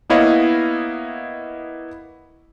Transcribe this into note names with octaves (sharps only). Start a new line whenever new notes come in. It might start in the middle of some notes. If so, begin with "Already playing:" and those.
A#3 B3 E4 C#5 D#5 F5